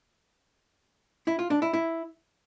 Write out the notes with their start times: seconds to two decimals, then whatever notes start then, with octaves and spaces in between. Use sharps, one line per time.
1.27 E4
1.39 F4
1.50 D4
1.62 E4
1.74 E4